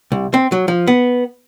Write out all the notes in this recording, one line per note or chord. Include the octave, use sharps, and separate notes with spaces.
C2
C4
F#3
F3
B3